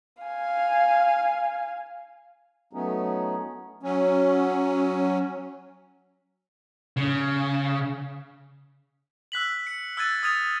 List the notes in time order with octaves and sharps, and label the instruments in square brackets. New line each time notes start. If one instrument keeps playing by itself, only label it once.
[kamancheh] F5 G#5
[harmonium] F#3 A3 B3 C#4 D#4
[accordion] F#3 C#4
[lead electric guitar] C#3
[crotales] E6 F#6 B6 F#7
C#7
E6 F#6 G#6 A6 D#7
D#6 F6 G#6 A6 D#7 F7